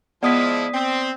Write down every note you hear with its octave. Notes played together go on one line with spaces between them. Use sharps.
F3 G#3 B3 E4 D5 D#6 B6
C4